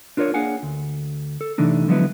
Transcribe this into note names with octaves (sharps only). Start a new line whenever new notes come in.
D4 F4 A#4 C5 C#5
A#3 D4 G#4 F5 F#5 G#5
D2
A4
C3 E3 A3 D4 D#4
D3 F3 F#3 G#3 B3 E4